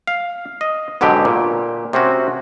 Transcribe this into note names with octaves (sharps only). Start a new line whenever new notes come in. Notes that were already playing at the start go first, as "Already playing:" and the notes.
F5
D#5
G#2 B2 D3 F#3 G4
A#2
C3 C4 C#4 F#4